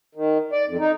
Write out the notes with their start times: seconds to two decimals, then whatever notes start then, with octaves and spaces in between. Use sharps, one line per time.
0.15 D#3
0.52 D5
0.67 F2
0.79 D#4